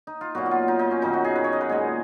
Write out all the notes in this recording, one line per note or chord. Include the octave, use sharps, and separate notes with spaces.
D#4
F4
A#2 F#3 B3 F#4
F#4
F4
D#4
D#4
C#4
F#2 D#3 F#3 D#4
F#4
G#4
B4
C#5
D#5
B4
A#2 G#3 B3 G#4